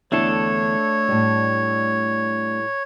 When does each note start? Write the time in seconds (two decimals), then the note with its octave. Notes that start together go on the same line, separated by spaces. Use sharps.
0.12 E2 D3 A3 D4 E4 A4 C#5
1.08 A2 G3